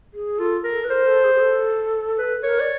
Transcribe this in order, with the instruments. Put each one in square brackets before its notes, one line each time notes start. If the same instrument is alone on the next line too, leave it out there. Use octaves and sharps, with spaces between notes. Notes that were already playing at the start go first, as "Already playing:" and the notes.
[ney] G#4
[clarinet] F4 [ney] A4
[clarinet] A#4
[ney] A4
B4
[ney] A#4 [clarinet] C5
[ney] A4
G#4
G#4
A4
[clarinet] B4
[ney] A#4 [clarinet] C#5
[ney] D5